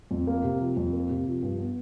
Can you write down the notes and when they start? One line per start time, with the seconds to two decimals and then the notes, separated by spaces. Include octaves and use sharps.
0.11 F2
0.27 A#3
0.44 C3
0.60 F3
0.77 F2
0.93 A#3
1.10 C3
1.26 F3
1.43 G2
1.59 B3